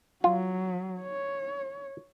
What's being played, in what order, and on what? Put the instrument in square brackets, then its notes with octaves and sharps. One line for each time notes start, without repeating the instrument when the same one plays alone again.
[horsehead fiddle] F#3 [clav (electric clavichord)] F4
[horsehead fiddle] C#5